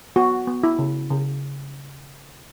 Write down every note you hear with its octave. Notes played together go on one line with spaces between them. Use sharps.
B3 F#4
B3
E4
C#3
C#3